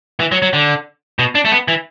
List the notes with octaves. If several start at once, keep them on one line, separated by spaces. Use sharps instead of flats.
E3
F#3
F#3
D3
B2
D4
A3
B3
E3